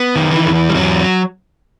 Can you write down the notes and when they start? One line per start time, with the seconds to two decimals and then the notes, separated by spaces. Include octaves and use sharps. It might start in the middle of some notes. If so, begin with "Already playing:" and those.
Already playing: B3
0.16 D#3
0.31 E3
0.45 E2
0.70 G3
0.75 E2 F#3